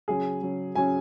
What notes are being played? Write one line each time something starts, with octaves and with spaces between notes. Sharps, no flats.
C#3 F#3 C#4 G#4
C#3 F#3 C#4
C#3 F#3 C#4 G#5